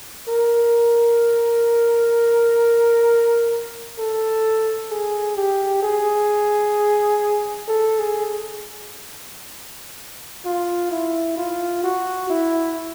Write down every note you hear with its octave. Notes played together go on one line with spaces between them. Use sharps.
A#4
A4
G#4
G4
G#4
A4
G#4
F4
E4
F4
F#4
E4